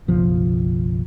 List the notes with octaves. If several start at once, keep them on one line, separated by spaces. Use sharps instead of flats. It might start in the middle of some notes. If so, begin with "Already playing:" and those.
F#1 B1 F3